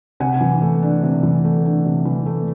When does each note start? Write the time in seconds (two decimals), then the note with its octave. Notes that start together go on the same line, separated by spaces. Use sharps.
0.20 C3 F#5 G#5
0.41 E3
0.62 A3
0.83 D4
1.03 C3
1.23 E3
1.44 A3
1.65 D4
1.85 C3
2.05 E3
2.26 A3